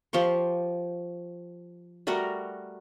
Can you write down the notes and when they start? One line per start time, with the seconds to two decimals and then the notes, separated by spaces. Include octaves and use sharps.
0.13 F3 G4 C6 C#6
2.07 G3 A3 F#4 A#4